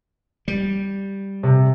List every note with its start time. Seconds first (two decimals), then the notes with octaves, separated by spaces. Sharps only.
0.48 G3
1.43 C3